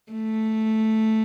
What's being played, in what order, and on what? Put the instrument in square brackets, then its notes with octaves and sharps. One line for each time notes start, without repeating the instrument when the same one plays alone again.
[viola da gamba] A3